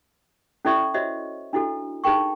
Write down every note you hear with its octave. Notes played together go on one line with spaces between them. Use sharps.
C#4 E4 A4 D5 E5 C#6
F#4 C5 C#5 D#5 E5
D4 E4 F#4 A4
D#4 G#4 A#4 G5 C#6